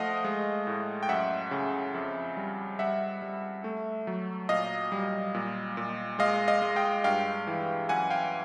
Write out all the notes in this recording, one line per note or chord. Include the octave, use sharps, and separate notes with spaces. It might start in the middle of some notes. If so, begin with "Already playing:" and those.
Already playing: F3 A3 D#5 F5 F#5
G#3
A2
G5
F#2 E5 F#5
C#3
F2
G3
G3 E5 F#5
G3
A3
F#3
A#2 D#5 F5
G3
A#2
A#2
G#3 D#5 F5
D#5 F5
G#3
F5 G5
G2 F5 G5
E3
F#2 F#5 G#5
F5 G5